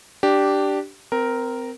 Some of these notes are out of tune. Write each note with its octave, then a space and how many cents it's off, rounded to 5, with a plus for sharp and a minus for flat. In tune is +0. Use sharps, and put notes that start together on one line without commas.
D4 +0 G4 -10
C4 -25 A#4 +0